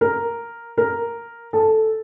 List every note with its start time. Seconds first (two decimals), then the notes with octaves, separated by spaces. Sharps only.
0.01 A#4
0.78 A#4
1.53 A4